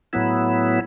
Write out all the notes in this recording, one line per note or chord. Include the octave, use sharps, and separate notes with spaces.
A2 F#3 B3 E4